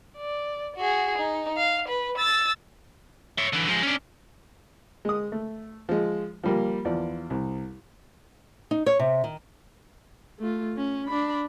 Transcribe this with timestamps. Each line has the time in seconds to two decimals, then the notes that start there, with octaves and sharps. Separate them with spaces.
0.17 D5
0.76 F#4 G#4
1.18 D#4
1.57 F5
1.88 B4
2.18 E6 A6
3.38 C#5 E5
3.53 D3 E3
3.69 F3 G#3
3.83 C#4 D4
5.05 G#3 D#6
5.32 A3
5.89 F3 G#3
6.43 F3 G3 A#3
6.85 E2 F3 D5
7.30 C2
8.71 D#4
8.86 C#5
8.99 C3
9.24 D#3
10.39 A3 F4
10.77 C#4
11.07 D4 B5